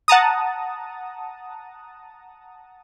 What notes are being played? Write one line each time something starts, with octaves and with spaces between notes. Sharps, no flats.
F#5 A5 A#5 D#6